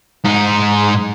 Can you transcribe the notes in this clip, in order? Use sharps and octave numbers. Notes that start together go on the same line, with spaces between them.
G#2 D#4